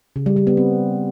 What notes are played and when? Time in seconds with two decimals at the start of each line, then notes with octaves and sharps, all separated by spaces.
0.16 C#3
0.26 G3
0.37 G3
0.47 B3
0.57 C4